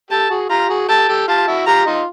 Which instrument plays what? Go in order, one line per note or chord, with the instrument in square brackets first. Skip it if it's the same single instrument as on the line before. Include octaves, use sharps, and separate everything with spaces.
[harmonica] G4 A4 [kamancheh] A5
[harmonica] F#4 G#4
[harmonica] F4 G4 [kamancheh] A#5
[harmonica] F#4 G#4
[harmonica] G4 A4 [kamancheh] A5
[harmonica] G4 A4
[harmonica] F4 G4 [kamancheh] A5
[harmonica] E4 F#4
[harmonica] F4 G4 [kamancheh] A#5
[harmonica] D#4 F4